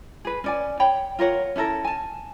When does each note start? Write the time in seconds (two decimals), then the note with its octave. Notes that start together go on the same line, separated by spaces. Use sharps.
0.25 G#4 B4
0.44 C#4 D5 G#5
0.80 C#5 G5 B5
1.19 F4 A#4 C#5 F#5
1.56 C#4 E4 A4 A#4
1.84 G#5 A5